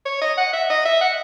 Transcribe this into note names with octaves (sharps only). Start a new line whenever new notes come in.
C#5
D#5
F#5
E5
D#5
E5
F#5